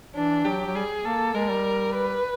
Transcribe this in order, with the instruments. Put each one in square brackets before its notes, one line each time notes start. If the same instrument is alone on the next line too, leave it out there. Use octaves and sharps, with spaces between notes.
[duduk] E3 [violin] D4
[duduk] F#3 [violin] G4
[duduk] F#3
[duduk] G3 [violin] G#4
[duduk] A#3 [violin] A4
[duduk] G#3 [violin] A#4
[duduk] G3
[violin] B4